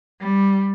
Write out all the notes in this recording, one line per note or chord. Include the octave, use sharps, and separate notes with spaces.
G3